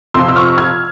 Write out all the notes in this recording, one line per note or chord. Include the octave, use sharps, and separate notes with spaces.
F2 C3 F3 C6 E6
E6
C#6 F6
F6 G#6